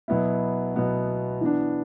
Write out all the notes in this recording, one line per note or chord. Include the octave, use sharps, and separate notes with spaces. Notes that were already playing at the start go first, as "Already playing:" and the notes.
B2 F#3 B3 E4
B2 F#3 B3 E4
E3 B3 D4